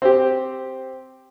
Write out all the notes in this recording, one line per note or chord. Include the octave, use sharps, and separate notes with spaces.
C4 G4